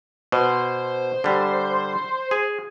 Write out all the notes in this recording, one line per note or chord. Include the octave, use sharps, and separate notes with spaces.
B2 C5
D3 G3
G#4